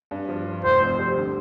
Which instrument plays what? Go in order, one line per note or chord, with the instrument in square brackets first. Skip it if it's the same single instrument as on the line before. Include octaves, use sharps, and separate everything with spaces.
[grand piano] G2
F3
F4
[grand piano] F1 [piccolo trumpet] C5
[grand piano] F2
G3
D3